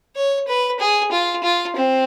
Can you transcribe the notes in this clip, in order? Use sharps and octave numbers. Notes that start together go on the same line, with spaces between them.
C#5
B4
G#4
F4
F4
C4